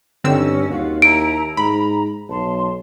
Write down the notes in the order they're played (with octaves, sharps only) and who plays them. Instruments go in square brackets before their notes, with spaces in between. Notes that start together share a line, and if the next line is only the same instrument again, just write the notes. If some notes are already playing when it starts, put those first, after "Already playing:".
[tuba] G2 [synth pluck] D3 C4 E6 [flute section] C#4 D#4
[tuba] D#2 [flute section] F4 F#4 F5
[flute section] E4 A5 A#5 [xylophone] D7
[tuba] G#2 [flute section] A#5 [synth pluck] B5
[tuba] B1 [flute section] A5 C6